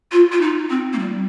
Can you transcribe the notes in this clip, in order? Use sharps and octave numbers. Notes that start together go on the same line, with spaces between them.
F4
F4
D#4
C4
A#3
G3